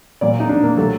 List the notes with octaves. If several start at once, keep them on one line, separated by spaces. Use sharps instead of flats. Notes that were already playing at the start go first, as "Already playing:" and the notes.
A#2 F#3 D5
D#4
D4
A#3
C3 F#3 A3